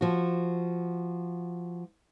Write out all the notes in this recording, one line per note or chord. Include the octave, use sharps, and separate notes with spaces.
F3 F#4